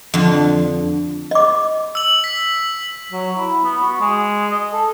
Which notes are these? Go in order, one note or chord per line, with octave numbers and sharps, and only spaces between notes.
F2 D3
D#5 D6
E6 F#7
B6
F#3
E4
B3
F#4
G#3
D#5
A4